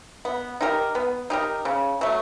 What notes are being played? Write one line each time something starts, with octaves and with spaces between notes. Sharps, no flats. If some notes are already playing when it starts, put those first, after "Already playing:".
B3
D#4 G4 A#4
B3
D#4 G4 A#4
C#3
F#3 A3